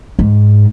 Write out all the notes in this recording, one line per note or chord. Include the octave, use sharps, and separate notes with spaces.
G#2